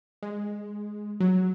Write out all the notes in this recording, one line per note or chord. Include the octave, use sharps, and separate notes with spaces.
G#3
F#3